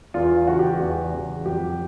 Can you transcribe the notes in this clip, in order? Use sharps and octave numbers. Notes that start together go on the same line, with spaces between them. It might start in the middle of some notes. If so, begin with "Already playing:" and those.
E2 F4
C#3 E3 F#4
G4
F#4
E2
C#3 E3
F2 G4